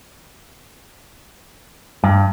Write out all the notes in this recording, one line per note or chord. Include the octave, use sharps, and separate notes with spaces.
G2